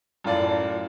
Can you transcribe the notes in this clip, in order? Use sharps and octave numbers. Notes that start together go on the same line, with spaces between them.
F#2 A2 F4 D5 A5